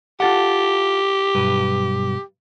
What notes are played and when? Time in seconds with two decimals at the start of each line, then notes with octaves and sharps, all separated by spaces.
0.20 F4 G4 A4 F#5
1.35 B1 G2 B4